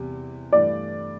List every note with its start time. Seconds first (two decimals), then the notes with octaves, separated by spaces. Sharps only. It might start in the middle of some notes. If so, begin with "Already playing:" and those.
Already playing: E2 C3 G3
0.53 G2 E3 A3 D5